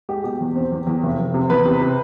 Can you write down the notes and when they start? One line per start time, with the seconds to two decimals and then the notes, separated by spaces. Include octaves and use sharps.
0.09 G#3 G4
0.24 B2 G4
0.40 E2
0.56 C4
0.72 E2
0.87 E2
1.03 F1
1.19 F1
1.34 C3
1.50 E2 B4
1.65 C3
1.81 C3